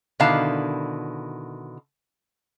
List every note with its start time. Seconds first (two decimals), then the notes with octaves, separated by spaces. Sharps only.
0.20 B2 D3 D#3 E4 F5 A5